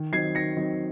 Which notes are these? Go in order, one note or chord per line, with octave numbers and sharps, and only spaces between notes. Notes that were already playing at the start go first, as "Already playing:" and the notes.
Already playing: D#3
F#3 C4 D#4 G#6 C7
D#3 A#6 C#7
F#3 C4 D#4